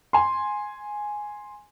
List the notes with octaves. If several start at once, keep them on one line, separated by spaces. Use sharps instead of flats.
G#5 C6